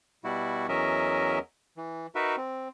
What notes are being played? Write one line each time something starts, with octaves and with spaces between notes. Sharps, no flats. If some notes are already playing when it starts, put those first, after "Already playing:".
B2 G3 E4 F#4
E2 F#3 C#4 A#4 D#5 E5
E3
D#4 F#4 A#4 B4 E5
C4